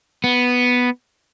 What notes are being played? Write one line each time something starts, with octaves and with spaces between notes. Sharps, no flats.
B3